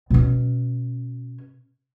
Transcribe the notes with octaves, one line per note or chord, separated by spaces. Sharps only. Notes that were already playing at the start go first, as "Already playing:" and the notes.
B2 C#4